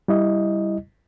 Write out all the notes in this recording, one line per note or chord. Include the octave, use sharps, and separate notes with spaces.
G3 E4 D#5